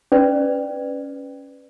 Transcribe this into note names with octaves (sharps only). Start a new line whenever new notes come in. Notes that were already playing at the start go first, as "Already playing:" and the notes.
C#4 B4 D5